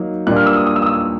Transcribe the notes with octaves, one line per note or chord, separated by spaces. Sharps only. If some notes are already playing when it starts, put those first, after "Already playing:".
Already playing: F#3 A#3 D#4
A#2 G3 A#3 D4 F#6
F6
E6
D#6
D#6
E6
D#6
E6